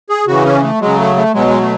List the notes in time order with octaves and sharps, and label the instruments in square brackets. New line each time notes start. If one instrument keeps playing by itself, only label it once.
[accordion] G#4
C#3 E3 F#4
C#4
A3
C#3 F#3 G#3
A3
A3
B2 F#3 G#3
G#3
A3